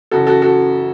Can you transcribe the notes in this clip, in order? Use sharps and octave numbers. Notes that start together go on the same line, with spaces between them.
F#2 C#3 E3 F#4 A4
F#4 A4
F#4 A4